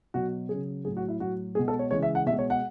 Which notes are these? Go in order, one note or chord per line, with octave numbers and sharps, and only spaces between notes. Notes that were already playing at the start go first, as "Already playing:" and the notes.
B2 F#3 F#4
C#3 F#3 G#4
A2 F#3 G#4
F#4
E4
A2 F#3 F#4
B2 G#3 G#4
A4
C#5
C#3 E3 G#3 C#5
E5
F#5
B2 G#3 E5
C#5
F#5